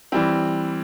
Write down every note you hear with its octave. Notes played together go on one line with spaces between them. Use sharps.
E3 G3 C4